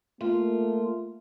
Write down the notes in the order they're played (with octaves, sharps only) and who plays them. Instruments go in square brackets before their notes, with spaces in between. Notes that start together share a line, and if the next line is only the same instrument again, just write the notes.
[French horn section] A3 A#3 [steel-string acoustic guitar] F4